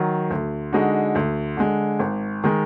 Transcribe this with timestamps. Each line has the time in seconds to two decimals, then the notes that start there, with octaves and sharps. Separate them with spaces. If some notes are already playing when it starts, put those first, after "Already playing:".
Already playing: D#3 F#3
0.30 D2
0.73 D3 G#3 D#4 F#4
1.15 D2
1.57 D3 G#3
2.00 G#1
2.44 D#3 G#3